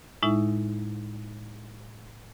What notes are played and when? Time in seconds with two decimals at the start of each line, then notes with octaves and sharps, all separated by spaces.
0.23 A2 G#3 D#4 E4 E5